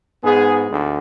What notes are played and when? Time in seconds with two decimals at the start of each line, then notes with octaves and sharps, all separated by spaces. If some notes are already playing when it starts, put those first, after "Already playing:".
0.23 G#2 G#3 B3 G#4
0.71 D2